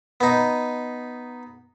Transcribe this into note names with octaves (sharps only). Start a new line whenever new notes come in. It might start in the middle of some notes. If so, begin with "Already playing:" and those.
B3 D#4